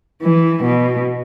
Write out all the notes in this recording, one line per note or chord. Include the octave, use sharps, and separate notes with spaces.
E3
B2